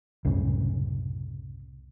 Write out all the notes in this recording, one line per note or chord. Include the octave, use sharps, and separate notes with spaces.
C2 F#2 A2 C#3